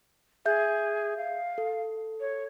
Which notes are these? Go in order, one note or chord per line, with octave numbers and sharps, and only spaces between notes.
G#4 E5 G6
F5
A4
C#5